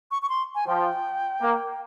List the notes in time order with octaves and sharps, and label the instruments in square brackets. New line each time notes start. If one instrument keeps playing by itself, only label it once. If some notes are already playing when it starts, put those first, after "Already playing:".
[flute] C#6
C#6
C6
G#5
[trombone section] F3 [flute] G5
[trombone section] A#3